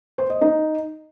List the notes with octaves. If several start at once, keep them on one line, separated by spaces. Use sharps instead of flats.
C5
D#5
D#4